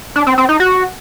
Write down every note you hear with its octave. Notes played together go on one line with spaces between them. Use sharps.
D4
C4
C4
D#4
F#4